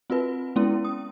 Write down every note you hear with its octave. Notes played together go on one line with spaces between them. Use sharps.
C4 F4 F#4 B4
G#3 B3 C#4 E4
D#6